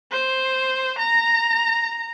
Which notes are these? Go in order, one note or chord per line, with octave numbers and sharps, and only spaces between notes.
C5
A#5